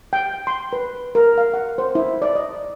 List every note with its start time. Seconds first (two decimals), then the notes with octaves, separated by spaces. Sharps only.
0.13 G5
0.47 C6
0.73 B4
1.15 A#4
1.38 F5
1.54 F#5
1.78 C5
1.95 E4
2.22 D5
2.35 D#5